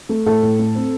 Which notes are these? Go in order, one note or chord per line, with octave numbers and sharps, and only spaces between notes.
A3
A2 A4
A2
A3
C4